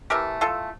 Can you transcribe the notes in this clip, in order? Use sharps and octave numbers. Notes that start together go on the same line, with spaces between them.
E3 A3 G4 A#4
F4 A4